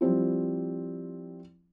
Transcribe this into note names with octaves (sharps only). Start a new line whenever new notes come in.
F3 G3 C4 E4